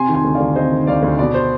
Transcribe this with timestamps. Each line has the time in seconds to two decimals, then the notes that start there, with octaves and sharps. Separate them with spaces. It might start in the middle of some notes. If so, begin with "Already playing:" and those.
Already playing: C3 G#5 C6
0.09 D#3
0.14 G#5 C6
0.24 D2
0.35 D5 F5
0.40 D2
0.56 C3 C5 D#5
0.72 D#3
0.87 D2 D5 F5
1.02 D2
1.19 B2 D5
1.34 C5